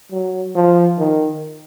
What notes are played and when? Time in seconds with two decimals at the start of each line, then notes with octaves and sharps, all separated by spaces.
0.12 F#3
0.55 F3
0.98 D#3